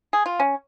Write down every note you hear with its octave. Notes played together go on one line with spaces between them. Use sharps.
G#4
F4
C#4